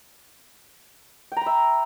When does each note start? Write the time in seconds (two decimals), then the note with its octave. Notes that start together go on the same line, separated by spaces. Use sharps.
1.32 G5
1.37 A#5
1.41 B5
1.46 E5